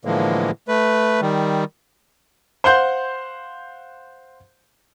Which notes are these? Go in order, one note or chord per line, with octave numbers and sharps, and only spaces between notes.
A2 D3 E3 F3 G#3 A#3
A3 B4
D#3 G3
C5 F5 F#5 C6 G6